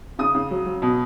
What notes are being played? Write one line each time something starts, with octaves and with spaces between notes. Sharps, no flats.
C#3 D#6
C#3
F#3
F#3
B2